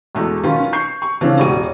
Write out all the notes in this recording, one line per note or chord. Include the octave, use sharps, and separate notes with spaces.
E2 B2 G#3 A3
B2 D#3 F#3 C#4 F4 B4
C#6 G6 C7
C#6
C#3 E3 F3 A3 C4 D4
E1 A1 B2 F#4 D#7